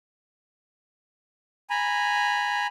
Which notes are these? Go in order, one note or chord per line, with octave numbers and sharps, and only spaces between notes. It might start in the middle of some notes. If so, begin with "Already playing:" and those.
G#5 A#5 B5